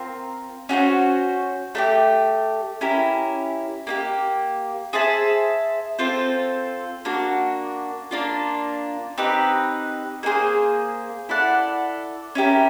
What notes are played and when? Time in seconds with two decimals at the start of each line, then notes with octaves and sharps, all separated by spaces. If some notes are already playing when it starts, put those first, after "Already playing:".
Already playing: C4 F4 A#4
0.69 C#4 F#4 A4 C5
1.75 A3 D4 G4
2.81 C#4 E4 G4 A#4
3.87 A#3 D#4 G4
4.93 G#4 C5 E5 A5
5.99 C4 F4 A4 C5
7.05 A#3 D4 F#4
8.11 A#3 D4 F4
9.18 C4 D#4 G4 B4
10.23 A#3 D#4 G#4 C5
11.29 E4 A4 D5 F#5
12.35 C#4 E4 G4 A#4